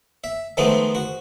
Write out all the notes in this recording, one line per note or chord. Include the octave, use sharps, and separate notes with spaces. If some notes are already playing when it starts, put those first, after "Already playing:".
E5
D#3 F3 G#3 A3 B3 C4
F#4